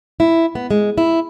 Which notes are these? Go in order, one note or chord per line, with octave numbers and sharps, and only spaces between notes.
E4
B3
G#3
E4